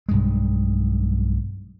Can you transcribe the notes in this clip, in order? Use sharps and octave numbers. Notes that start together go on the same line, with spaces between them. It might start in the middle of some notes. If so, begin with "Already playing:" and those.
B1 G2 G#3